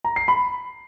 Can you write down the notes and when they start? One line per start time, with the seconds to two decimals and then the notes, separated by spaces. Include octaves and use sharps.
0.04 A#5
0.16 C7
0.28 B5